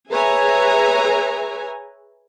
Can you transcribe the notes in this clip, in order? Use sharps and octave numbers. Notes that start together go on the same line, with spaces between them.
G#4 B4 C#5 E5 G#5 A#5